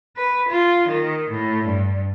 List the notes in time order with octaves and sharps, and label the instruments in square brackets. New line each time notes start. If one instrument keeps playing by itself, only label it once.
[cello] B4
F4
D#3
A2
G2